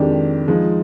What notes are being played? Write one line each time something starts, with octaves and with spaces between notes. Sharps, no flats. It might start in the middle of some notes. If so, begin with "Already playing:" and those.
Already playing: F2 D#3 G#3 D4 G4
F3 G#3 D#4